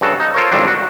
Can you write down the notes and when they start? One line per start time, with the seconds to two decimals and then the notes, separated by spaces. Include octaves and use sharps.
0.01 G2 C#3 F#4 A4
0.20 D#4
0.34 F4 A4 A#4 C5 C#5
0.51 G#1 F2 C#3 G3 C4 D4
0.68 F#4